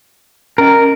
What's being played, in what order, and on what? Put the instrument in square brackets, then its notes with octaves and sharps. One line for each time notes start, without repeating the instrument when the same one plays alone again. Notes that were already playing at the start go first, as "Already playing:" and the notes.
[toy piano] C#4 D#5 [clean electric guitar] A#4